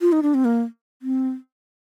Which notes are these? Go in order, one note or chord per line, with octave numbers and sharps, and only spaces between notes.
F4
D#4
D4
C4
A#3
C4